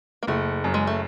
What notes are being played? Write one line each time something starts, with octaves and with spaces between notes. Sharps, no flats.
A#3
F#1 A3
F#2
G#3
A3